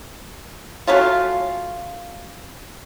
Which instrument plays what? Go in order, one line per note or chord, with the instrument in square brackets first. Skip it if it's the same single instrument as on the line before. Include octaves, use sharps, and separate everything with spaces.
[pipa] F#3 A3 C#4 F4